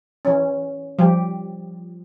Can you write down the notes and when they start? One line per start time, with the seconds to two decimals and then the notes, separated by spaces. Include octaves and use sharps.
0.25 E3 C#4
0.99 F3 G3 G4